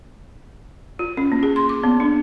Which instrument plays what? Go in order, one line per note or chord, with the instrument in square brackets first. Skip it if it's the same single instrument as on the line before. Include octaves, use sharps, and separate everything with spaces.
[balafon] F4
C#4
A#3
G#4
C6
D6
B3
D4